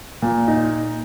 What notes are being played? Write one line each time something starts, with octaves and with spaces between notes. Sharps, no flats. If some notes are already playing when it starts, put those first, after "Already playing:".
A#2
D#4